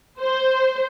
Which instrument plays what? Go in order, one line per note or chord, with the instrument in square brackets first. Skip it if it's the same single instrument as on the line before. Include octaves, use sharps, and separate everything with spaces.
[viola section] C5